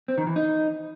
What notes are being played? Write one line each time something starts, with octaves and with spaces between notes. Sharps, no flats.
C4
D#3
E3
D#4